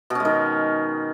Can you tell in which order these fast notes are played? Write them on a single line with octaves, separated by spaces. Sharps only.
B2 C#4 G#3 D#3